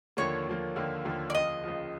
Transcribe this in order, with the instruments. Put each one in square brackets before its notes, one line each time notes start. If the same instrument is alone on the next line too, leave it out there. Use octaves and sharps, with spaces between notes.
[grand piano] D#2 D3 F3 A#3 [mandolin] C#5
[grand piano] D#2 D3 F3 A#3
D#2 D3 F3 A#3
D#2 D3 F3 A#3
[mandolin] D5
[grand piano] C#2 C#3 F3 [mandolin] D#5
[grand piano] C#2 C#3 F3